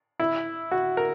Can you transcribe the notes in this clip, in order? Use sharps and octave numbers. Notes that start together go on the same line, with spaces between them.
E4
F#4
A#4